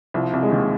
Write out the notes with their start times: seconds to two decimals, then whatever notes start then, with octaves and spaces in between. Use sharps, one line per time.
0.14 C2 C3 F3
0.33 C2 C3
0.43 G#3
0.52 D#2 D#3